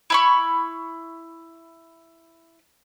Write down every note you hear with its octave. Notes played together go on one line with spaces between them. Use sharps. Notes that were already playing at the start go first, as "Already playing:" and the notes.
E4 B5 C#6